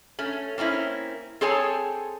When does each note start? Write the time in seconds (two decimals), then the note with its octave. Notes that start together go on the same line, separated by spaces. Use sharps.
0.19 A3 C#4
0.58 A#3 C4 C#4 E4
1.41 C4 G#4 A4 C#5 G#5 A5